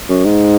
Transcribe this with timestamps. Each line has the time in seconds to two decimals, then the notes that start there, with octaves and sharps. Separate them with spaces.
0.09 F#2
0.25 G#2